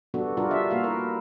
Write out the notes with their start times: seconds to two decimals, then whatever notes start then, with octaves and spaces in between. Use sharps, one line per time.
0.14 G3 B3 D4 F#4 A4
0.37 G3 D4 F4 F#4 A#4
0.51 E5
0.71 A#3 F#4 F5
0.84 E4 A#4